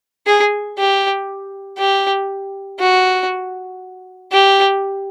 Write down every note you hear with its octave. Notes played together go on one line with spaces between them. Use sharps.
G#4
G4
G4
F#4
G4